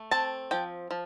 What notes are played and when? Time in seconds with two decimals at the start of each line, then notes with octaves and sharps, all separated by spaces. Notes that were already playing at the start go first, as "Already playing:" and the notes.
Already playing: A3
0.11 C4 A5
0.51 F3 G5
0.91 F3